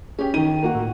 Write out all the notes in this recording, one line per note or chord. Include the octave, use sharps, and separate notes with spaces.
C#4 G4 G#4
D#3 D#4 D#7
A#3 F#4 F#5
A2